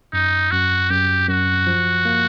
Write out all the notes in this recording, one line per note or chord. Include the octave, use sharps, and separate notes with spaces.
F#2 D#4
F#2 F#4
F#2 G4
F#2 F#4
F3
A#3